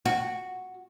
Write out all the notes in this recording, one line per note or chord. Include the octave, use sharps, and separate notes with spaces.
F#4